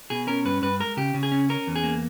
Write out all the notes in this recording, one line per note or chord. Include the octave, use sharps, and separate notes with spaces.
B2 G#4
C#4 A#4
G2 B4
G2 B4
G#3 A#4
C#3 G4
C#3
G#4
C#4
C#4 A#4
E2
G#4
A#3